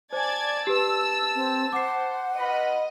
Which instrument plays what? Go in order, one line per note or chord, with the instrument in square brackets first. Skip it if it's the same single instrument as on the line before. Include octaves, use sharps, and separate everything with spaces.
[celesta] C5 G#5 [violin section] D5 G#6 A6 [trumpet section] A5
[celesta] G4 B4 [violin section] E6
[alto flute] C4
[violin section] C5 [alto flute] F#5 [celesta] D6 C7
[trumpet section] F4 B4 B5 [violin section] D#5